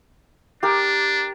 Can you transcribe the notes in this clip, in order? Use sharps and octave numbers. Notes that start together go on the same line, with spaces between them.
D4 G4 A#4